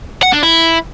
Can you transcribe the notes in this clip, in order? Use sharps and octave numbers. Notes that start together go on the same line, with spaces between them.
F#5
D4
E4